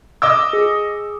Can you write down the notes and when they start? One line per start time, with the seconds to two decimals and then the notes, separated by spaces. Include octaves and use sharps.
0.22 D#5 D6 E6
0.53 G#4